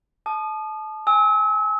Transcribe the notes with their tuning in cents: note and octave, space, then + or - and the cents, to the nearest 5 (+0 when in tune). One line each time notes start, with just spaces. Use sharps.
A5 -25 D#6 -30
G#5 +0 E6 -40